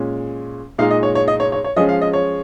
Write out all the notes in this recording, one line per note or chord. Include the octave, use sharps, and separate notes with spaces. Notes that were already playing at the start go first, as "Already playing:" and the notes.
Already playing: A#2 G#3 C#4
A#2 G#3 D#4 F5
D#5
C#5
C#5
D#5
C#5
C#5
C#5
F3 G#3 C#4 D#5
F5
D#5
C#5